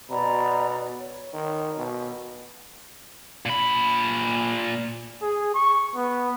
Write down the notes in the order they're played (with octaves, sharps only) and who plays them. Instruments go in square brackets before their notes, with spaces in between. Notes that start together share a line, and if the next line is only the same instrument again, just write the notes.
[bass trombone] B2 [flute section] D5 A#5 B5
[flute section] C#5
[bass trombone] D#3
B2
[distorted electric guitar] A#2 B5
[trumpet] G#4
C#6
B3